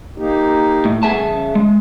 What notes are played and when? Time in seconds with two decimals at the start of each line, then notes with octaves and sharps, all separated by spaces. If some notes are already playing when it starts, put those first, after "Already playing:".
0.18 A#3 D#4 G4
0.85 A2
1.03 A3 B3 G#4 E5 G#5 A5
1.20 C#3
1.55 G#3